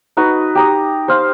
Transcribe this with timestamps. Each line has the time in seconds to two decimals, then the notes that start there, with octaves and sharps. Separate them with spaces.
0.17 D#4 F#4 B4
0.55 G4 A#5 D#6
1.08 C5 F5